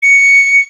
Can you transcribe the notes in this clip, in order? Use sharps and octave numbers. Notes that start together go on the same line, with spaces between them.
C#7